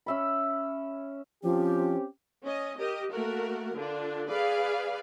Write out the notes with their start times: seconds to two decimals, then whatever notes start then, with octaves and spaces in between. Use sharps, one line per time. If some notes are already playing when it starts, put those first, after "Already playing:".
0.06 C#4 E5 B5
1.43 F3 C4 C#4 G4
2.44 C#4 D#5
2.79 G4 A#4 D#5
3.11 A3 A#3 F#4 A#4
3.75 D3 D4 F4
4.28 G#4 B4 D5 F5